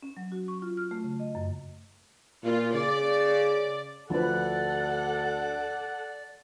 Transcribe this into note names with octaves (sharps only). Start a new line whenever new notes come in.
C#4
F#3
F#4
C#6
F4
F6
A3
C#3
D#5
F#2
A#2 F4
C#3 D5
D2 F3 A4 B4 D5 F#5